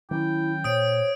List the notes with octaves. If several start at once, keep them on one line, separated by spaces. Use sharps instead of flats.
D#3 F#3 C#4 E4 G5
A#2 C5 C#5 D#6 D7